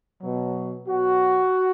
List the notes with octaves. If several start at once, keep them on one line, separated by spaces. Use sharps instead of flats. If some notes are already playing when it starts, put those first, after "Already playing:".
B2 F#3
B2 F#3 F#4